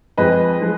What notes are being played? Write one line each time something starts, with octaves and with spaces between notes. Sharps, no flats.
F2 F3 G#3 B4 D#5
F3 G#3